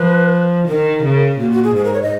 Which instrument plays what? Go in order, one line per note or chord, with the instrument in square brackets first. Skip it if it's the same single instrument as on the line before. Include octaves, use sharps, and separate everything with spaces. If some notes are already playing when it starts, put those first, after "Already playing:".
Already playing: [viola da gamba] F3 [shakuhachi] B4
[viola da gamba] D#3 [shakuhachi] A#4
[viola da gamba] C#3
[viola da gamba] A#2 [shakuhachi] F#4
[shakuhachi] F#4
G#4
[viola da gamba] G#2 [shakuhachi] G#4
[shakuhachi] A#4
C#5
D#5